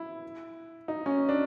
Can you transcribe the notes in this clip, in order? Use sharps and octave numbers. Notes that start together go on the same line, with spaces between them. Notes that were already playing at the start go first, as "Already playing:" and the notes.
Already playing: E4
D#4
C#4
D4